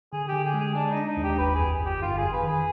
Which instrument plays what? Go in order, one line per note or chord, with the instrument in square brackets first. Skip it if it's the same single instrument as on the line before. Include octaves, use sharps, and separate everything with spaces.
[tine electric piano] D3 [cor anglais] G#4
[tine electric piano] D3 [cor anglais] G4
[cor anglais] G#4
[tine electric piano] G#3
[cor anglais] G#4
[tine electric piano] G#3 [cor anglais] D4
[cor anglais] D#4
[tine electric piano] D4
[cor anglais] D#4
[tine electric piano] D#2
[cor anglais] G4
[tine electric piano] G1 [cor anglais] B4
[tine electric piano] F2 [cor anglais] G#4
[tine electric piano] G1 [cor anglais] G4
[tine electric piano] G1 [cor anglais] F4
[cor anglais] G#4
[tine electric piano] F2
[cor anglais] B4
[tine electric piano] D#3
[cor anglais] G#4